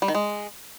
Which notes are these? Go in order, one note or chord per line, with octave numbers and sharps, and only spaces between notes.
G3
D#3
G#3